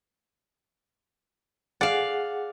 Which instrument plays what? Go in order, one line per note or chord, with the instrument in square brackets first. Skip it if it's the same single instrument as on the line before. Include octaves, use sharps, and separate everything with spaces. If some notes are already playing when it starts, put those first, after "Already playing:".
[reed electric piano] G#4 F#5 [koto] D5 F5